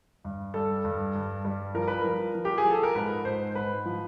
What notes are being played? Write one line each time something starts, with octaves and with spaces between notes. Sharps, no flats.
G2
G3 A4
G2
G2
G3
F3 A#4
B4
F3 A#4
F3
G4
G#4
F3
A4
A#4
G#2 B4
G#2 C5
G#2 B4
F3